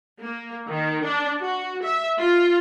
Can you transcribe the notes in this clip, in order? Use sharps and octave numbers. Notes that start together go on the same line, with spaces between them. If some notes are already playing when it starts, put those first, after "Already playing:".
A#3
D#3
D4
F#4
E5
F4